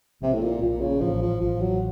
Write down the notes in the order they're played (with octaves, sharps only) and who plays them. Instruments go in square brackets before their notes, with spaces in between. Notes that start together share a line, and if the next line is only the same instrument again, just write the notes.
[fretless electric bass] A#1 [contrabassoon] C3
[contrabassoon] A2
A#2
[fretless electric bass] A#1 [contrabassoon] A#2
[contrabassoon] C#3
[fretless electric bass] A1 [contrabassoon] F3
[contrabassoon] F3
[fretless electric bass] A1 [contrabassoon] F3
[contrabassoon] F#3